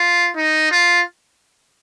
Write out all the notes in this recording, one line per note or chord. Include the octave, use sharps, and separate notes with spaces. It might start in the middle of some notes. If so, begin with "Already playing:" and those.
Already playing: F4
D#4
F4